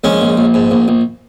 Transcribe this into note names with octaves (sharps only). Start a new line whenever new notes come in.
A#1 G#3 C#4
A#1
A#1
G#2
A#1
A#1